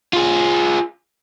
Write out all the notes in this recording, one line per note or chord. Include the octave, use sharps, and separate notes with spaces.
F4 G#4